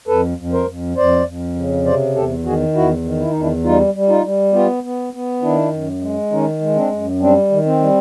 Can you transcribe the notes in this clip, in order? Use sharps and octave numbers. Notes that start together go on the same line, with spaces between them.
F2 A4 B4
F2
A#4 C5
F2
F2 C5 D5
F2
C#3
C3 C5 D5
E2 G4 A4
D#3 F#4 G#4
E2 E4 F#4
D#3
E4
E2 D#4
D4 E4
G3 D#4 F4
G3
D#4 F4
G3
B3 F4 G4
B3
B3
D#3 D4 E4
F#2
G#3
D#3 C#4 D#4
G#3
C4 D4
F#2
G3 C4 D4
D#3
C4
G3